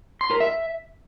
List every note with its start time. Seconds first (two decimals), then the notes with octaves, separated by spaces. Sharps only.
0.21 C6
0.31 A#4
0.40 E5